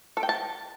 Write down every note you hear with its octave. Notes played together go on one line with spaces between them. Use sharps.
A4
G5
A5